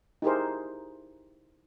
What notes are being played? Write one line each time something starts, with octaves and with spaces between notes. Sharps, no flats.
D#4 E4 G4 G#4 A#4 C5